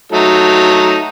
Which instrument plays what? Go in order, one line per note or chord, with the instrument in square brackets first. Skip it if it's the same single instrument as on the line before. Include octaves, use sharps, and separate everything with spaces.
[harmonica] F#3 A3 D#4